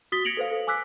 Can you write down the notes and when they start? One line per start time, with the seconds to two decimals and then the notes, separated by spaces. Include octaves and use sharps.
0.12 F#4 D#6 A6 B6 G7
0.25 G#6 A#6 C#7 D7 F7 F#7
0.37 A4 B4 C5 F5
0.51 A4
0.67 G#5 D6 E6 F#6 B6